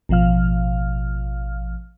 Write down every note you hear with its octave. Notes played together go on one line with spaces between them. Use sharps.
A1 B2 F3 F5 F6